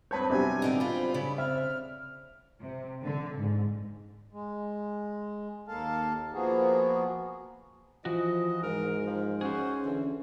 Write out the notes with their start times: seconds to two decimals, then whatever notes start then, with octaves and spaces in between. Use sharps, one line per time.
0.11 G2 C4 B4 C#5 A5 G6
0.30 C3 F#3 G3 B3 D4 G4 G#5
0.62 D3 C4 D#4
0.80 F4 C5 B5
1.14 C#3 D5
1.38 C4 E5 F6
2.61 C3
3.03 D3
3.37 G#2
4.33 G#3
5.68 D#2 A#3 A4 F5 A5
6.33 F3 A#3 B3 F#4 G#4
8.05 E3 F3 F#4 D#5
8.63 G#2 A#4
9.06 F3
9.41 C#4 F#4 G#4 C5
9.85 D3 E3